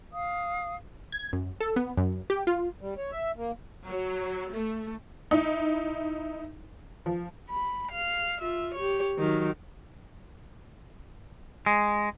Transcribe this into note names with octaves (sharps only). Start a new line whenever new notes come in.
F5 D#6
G#6
F#2
A4
B3
F#2
G4
F4
G3
C#5
E5
A#3
F#3
A3
D#4 E4
F3
B5
F5
F4 E5
G4 C#5
D#3 F#3
G#3